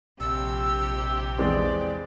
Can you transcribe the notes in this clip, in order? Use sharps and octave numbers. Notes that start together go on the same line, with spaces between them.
A#1 C3 G4 E6
E2 G#3 C4 D5